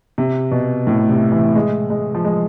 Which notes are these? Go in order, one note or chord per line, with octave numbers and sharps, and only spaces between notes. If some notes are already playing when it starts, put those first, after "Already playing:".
C3
B2
A2
C3
E3
G#3
G#3
F3
G#3